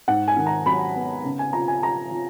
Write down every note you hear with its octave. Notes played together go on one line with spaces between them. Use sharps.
G#2 F#5
G#5
D#3
A#5
F#3 B5
B3
C#3
G#5
F3 A#5
G#5
F3 A#5
F3